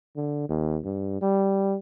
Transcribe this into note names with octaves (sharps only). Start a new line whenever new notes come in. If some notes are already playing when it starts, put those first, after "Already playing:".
D3
D#2
G2
G3